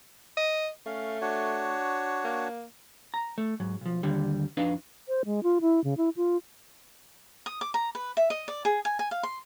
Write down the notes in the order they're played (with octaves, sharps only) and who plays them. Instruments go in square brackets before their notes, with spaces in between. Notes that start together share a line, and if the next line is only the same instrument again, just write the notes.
[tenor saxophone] D#5
[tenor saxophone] A3 [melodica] C#4 F5
[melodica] D4 F#4 C#5
[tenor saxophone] A#3
[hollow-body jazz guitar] A#5
A3
G#2 F#3
B1 F3
D#2 D3 G3
F2 D4 D#4 B4 F5
[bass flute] C5
G#3
F4
E4
C#3
E4
F4
[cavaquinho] D#6
D6
A#5
B4
E5
D#5
D5
G#4
G#5
G#5
F5
C6